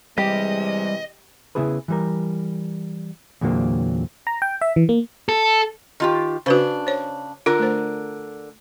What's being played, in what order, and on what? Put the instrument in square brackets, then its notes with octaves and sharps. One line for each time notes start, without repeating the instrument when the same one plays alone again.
[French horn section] C3 E3 G#3 [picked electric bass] G3 [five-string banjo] G4 [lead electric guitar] D#5
[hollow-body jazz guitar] C#3 B3 E4 G#4 B4
E3 G3 A#4
E2 A#2 D3 F#3 A#3 C4
[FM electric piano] A#5
G5
E5
E3
A#3
[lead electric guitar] A4
[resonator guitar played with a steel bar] D#3 F4 G4
[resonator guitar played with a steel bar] C#3 D4 [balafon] F#4 B4 C5
[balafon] C5 C#5
[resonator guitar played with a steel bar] D3 A#4 [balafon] F4
[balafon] A3 C5